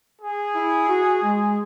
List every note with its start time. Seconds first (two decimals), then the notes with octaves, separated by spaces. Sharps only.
0.21 G#4
0.55 E4
0.89 F#4
1.23 G#3